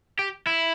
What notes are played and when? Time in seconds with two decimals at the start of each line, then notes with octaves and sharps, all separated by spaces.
0.19 G4
0.47 E4